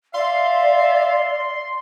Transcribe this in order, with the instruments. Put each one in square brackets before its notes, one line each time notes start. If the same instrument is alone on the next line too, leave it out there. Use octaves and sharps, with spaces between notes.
[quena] D5 [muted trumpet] E5 [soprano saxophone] F5 [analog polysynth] C6